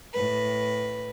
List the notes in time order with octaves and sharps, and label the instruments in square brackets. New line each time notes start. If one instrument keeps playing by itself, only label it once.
[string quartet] A2 B4